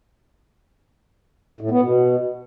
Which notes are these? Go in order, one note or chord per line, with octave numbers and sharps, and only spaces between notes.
A2
B3
B2